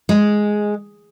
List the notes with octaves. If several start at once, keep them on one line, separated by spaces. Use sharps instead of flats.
G#3